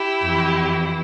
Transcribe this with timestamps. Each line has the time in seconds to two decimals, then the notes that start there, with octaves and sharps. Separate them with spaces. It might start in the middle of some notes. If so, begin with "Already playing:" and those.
Already playing: E4 G4
0.21 F2 E3